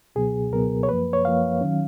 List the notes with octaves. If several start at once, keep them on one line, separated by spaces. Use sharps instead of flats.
C#2 B2 F#3 B3 G#4
C#2 B2 F#3 B3 A#4
C#5
F#2 F3 A#3 B4
C#5
F#2 F3 A#3 F5
D#3 F#3 C#4